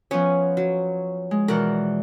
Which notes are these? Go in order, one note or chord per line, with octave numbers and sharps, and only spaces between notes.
F3 B3 C#4 C#5
F#3
G#3
B2 E3 A#4 D5 F#5